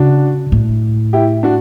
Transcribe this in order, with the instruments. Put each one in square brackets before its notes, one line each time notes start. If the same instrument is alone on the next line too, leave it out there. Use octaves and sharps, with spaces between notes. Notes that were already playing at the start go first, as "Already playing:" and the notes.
Already playing: [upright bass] C#3 [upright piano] D4 F#4
[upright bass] A2
[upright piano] E4 G4
D4 F#4